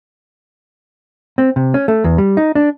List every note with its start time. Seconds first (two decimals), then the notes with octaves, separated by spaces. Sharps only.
1.38 C4
1.56 C3
1.74 C#4
1.88 A3
2.04 E2
2.18 G3
2.37 D#4
2.55 D4